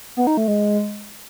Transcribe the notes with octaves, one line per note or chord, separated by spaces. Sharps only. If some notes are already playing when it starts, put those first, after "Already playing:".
B3
D#4
A3
G#3